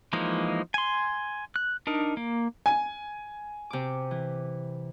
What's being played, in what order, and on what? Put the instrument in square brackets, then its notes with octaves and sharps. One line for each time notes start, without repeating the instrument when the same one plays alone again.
[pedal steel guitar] E3 F3 G#3 A#3 D#4
G#5 C6
F#6
D4 D#4 A#4
A#3
[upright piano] G#5
[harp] C3 D6
E3